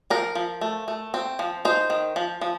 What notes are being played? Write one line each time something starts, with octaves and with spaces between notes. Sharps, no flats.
F3 A#4
F3
A3
A3
C4
F3
D#4 C5
D#3
F3
F3